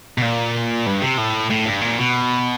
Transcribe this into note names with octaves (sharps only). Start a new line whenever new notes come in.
B2
A#2
G2
C3
A2
A2
G2
A#2
B2